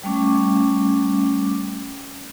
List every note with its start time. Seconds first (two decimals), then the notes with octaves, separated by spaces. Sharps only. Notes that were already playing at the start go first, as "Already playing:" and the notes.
0.04 G3 A3 C#4 D6